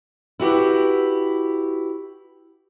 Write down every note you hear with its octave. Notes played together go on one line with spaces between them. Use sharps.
E4 F#4 G4 B4